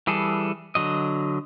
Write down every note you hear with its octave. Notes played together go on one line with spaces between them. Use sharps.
E3 G3 G#4 A4
D3 F#3 D#5